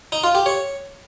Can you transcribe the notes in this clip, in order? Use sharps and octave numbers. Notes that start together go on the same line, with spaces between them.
D#4
F4
G4
C#5